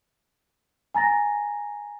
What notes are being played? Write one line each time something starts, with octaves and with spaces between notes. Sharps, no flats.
G#5 A#5 A6 A#6